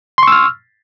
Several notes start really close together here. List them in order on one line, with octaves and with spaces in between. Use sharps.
C6 C#6 E6 F6